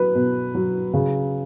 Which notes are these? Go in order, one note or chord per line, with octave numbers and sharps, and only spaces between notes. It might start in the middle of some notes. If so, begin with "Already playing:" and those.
Already playing: F#3 B4
B2
F#3
C#3